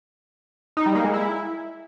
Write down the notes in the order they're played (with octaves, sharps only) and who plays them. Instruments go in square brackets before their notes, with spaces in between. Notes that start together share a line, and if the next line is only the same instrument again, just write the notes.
[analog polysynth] D#4
G3
A#3
G#3
E4